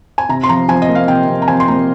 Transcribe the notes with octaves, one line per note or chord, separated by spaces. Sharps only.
G#5
C3 A#5
C6
F3 A#5
F3 G#5
D#5
A#3
F5
C3 G5
C3
A#5
F3 G#5
C6
A#3 A#5